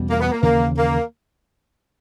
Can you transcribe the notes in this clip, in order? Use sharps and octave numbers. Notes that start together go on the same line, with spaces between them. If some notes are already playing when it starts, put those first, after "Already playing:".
Already playing: E2 B2 G3 C#4
A#3
B3
A#3
D#2 C#3 E3 A#3
A#3